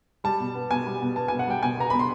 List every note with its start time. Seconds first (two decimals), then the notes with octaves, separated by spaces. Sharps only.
0.24 G3 A5
0.40 B2
0.55 B3
0.70 B2 G#5
0.86 G3
1.02 B2
1.16 B3 A5
1.28 G#5
1.32 B2
1.39 F#5
1.47 G3 G5
1.63 B2 G#5
1.78 B3 A#5
1.90 B2 B5
1.99 C6